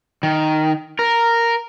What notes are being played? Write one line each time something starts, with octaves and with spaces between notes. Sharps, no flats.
D#3
A#4